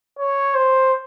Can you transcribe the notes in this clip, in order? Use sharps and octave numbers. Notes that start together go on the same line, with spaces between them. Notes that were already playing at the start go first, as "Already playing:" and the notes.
C#5
C5